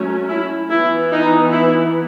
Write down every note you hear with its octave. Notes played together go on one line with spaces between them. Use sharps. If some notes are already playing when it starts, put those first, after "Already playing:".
Already playing: F#3 A3 C#4
E4
E3 B3 E4
D#4
E4